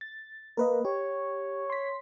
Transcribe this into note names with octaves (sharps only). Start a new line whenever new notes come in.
A6
A#3 A#4 B4 D#5
G4 C#5
C6 B6